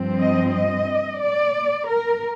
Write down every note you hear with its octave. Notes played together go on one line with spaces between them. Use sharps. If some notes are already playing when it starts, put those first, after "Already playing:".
Already playing: G2 F3 C4
D#5
D#5
D5
A#4